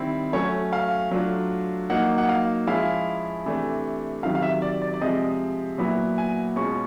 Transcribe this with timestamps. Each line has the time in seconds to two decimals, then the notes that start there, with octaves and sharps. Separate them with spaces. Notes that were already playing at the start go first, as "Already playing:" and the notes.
Already playing: D#3 G3 C4 E4
0.33 F#3 A3 C#4 C#5
0.73 F5
1.11 F#3 A3 D4 F4
1.90 F#3 A#3 D#4 F#5
2.18 F#5
2.29 F5
2.67 F3 G#3 C#4 E4 F5
3.45 C3 E3 A3 D4
4.23 C3 D#3 F#3 F5
4.35 F5
4.42 E5
4.62 D5
4.82 D5
4.94 D5
5.01 C3 F3 G#3 C4 D#5
5.78 A#2 F#3 B3 E4
6.18 G#5
6.56 B2 G#3 C#4 F4 C#6